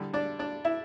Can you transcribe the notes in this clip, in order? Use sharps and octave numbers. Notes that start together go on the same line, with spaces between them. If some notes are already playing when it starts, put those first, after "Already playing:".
Already playing: D3 G3
D4 D5
D4 D5
E4 E5